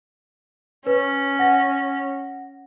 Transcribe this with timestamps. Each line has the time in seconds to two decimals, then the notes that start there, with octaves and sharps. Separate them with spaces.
0.87 C#4 B4
1.39 F#5 A#6